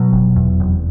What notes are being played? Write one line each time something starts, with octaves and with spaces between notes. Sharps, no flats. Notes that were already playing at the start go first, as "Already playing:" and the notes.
Already playing: B2 F#3
F1
E2
F1